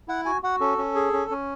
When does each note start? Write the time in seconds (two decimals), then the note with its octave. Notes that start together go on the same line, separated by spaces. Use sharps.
0.08 E4 F#5
0.25 F#4 G#5
0.43 F#4 F#5
0.60 C#4 A4
0.78 C#4
0.95 G#4
1.13 C#4
1.31 C#4